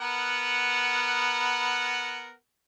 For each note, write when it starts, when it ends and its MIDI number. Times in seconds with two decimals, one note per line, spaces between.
0.01 2.33 59
0.01 2.33 70
0.01 2.33 78